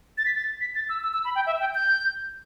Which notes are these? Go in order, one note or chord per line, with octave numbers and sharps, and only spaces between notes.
A6
B6
A6
B6
A6
E6
E6
E6
B5
G5
E5
G5
G6